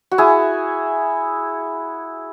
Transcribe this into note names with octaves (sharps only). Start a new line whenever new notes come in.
F#4
E4 G#4